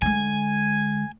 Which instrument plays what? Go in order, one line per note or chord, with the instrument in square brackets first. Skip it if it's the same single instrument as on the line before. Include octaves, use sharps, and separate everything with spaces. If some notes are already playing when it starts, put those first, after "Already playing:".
[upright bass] D3 G#3 [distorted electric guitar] G#5